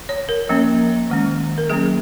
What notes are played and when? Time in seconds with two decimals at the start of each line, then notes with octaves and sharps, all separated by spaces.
0.09 C#5
0.29 A#4
0.49 F3 A#3 C#4
1.10 D#3 G#3 C#4
1.58 A#4
1.70 F#3 A#3 C#4 G#4